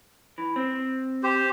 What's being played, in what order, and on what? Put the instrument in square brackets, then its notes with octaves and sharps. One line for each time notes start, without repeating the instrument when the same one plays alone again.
[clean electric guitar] E3
C4
[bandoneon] G4 C5